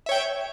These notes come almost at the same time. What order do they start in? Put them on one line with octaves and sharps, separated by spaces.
E5 C#5 G5